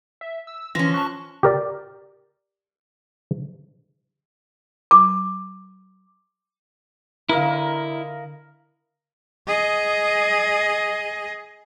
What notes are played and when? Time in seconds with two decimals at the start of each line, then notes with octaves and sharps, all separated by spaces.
0.21 E5
0.47 E6
0.75 E3 F3 C#4 A#6
0.94 A5 C#6 F#6
1.43 G4 A#4 D5
4.91 D6
7.29 D3 E4 A#4 D#5 F5
9.47 G#4 D#5